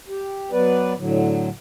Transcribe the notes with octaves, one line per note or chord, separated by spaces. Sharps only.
G4
F#3 B3 B4 D5
A2 D3 F#3